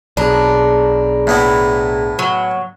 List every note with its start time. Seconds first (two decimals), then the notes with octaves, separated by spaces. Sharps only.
0.17 B1 D4 G#4 A#5 B5
1.27 A2 B3 E4
2.19 F#3